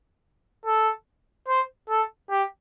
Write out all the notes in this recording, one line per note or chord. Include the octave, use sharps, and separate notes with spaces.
A4
C5
A4
G4